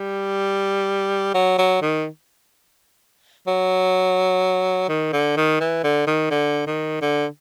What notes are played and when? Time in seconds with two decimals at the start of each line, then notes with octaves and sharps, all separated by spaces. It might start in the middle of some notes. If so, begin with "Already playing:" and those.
Already playing: G3
1.34 F#3
1.58 F#3
1.82 D#3
3.47 F#3
4.89 D#3
5.13 D3
5.36 D#3
5.60 E3
5.84 D3
6.07 D#3
6.31 D3
6.67 D#3
7.01 D3